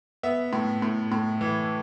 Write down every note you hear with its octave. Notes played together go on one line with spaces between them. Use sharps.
B3 E5
A2
A2
A2
E3